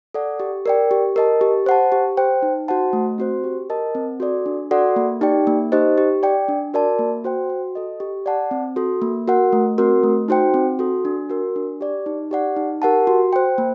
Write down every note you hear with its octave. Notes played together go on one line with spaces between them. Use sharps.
A4 D5 F#5
G4
A#4 D5 G5
G4
A#4 D#5 A5
G4
C5 F#5 A5
G4
C5 G5
D#4
F#4 C5 F#5 A5
A3
C4 F#4 C5
G4
A#4 D#5 A5
C4
F#4 A4 D5
D4
F#4 A4 D5 F#5
A#3
D#4 G4 D5 G5
A#3
D#4 G4 C5 D#5
G4
D5 G5
D4
F#4 A#4 D5 A5
A#3
F#4 C5 G5
F#4
A4 D#5
G4
D5 F#5 A5
C4
F#4 A4
A#3
F#4 A#4 F#5
A3
C4 F#4 A#4
A3
D#4 F#4 C5 G5
C4
F#4 A4
D4
F#4 A#4
D4
G4 D5
D#4
G4 D5 F#5
D#4
G4 A#4 F#5 A5
F#4
C5 G5
A#3